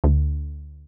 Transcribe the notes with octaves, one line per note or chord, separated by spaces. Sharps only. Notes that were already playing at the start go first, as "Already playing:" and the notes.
D2